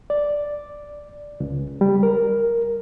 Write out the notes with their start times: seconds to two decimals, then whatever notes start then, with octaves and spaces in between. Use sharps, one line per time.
0.10 D5
1.40 C#2
1.81 G3
2.03 A#4